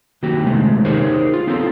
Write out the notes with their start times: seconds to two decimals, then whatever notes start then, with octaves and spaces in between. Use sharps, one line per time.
0.23 D#3 F#3 A#3 F#4 G4
0.46 C3 D#3 G#3 A3
0.85 D#4 G4 G#4 A#4 C5 C#5
1.34 F4
1.47 B3 C4 E4 F4 A4